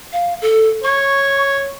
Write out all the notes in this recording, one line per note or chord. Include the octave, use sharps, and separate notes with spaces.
F5
A4
C#5 C#6